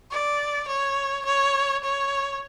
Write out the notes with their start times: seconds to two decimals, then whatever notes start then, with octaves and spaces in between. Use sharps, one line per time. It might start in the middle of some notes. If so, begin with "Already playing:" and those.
0.12 D5
0.68 C#5
1.25 C#5
1.84 C#5